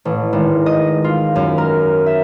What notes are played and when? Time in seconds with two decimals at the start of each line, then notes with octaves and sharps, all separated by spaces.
0.05 A1
0.33 G#1
0.66 D#5
1.04 F4
1.35 F#2
1.58 A#4
2.06 E5